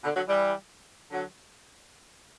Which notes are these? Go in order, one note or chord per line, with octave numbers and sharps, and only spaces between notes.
B2 D3
D3 F#3
E3 G3
D3 F#3